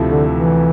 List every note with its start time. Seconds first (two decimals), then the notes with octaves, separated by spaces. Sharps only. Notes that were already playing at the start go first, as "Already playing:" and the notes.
Already playing: D2 C3 F3 A3 E4
0.09 D3
0.32 E3